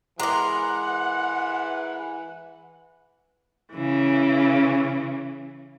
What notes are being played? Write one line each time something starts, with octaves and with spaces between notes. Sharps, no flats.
E3 G#3 A#4 F#5 A#5 C6 D6
C#3 E3